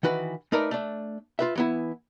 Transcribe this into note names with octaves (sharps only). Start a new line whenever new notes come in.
D#3 E3 F#4 B4
A3 D#4 A#4 B4 D5
A3 D4
F4 B4 E5
E3 B3 E4